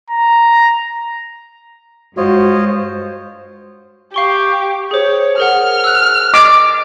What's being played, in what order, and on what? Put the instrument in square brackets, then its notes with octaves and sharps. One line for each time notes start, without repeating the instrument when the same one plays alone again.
[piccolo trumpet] A#5
[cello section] G2 G#3 [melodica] F4 C#5 D#5 [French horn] F#4 [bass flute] C5
[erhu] G4 [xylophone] F5 C#6 G7
[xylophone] G#4 C5 [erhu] C#5
[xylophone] G#4 A#4 F#5 [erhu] F6
[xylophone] E6 F#6
[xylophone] D#5 [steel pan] D6